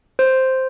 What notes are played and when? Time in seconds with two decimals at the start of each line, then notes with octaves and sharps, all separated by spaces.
0.19 C5